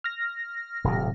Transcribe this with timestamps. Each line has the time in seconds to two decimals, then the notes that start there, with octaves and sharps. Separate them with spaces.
0.04 F6 A#6
0.84 D#1 D#2 A2 C3 F#3